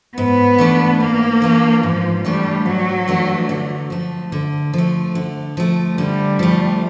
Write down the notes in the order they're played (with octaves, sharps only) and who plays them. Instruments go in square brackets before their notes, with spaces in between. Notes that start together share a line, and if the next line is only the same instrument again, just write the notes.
[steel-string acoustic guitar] G#2 [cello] B3
[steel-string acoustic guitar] E3 A3 D4
[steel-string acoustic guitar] G#2 [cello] A#3
[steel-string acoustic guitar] E3 A3 D4
[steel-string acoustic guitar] G#2 [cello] F3
[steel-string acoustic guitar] E3 A3 D4 [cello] G3
[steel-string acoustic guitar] G#2 [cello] F#3
[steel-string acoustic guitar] E3 A3 D4
D3
F3 A3
D3
F3 A3
D3
F3 A3
[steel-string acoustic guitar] D3 [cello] G3
[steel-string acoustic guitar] F3 A3